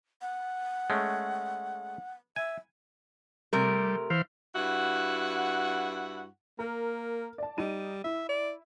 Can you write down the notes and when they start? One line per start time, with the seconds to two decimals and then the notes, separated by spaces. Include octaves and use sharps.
0.22 F#5
0.90 G#3 A3 C#4
2.36 E5 G#5
3.53 C3 G3 A3 A#4
4.10 E3 C5 F5
4.55 G2 E4 F#4 F#5
6.59 A#3 A#4
7.38 D5 A5
7.58 G3 D#4 D#7
8.04 E4 E5
8.29 D5